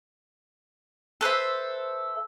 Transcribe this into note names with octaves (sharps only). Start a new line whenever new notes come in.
A4 B4 C5 E5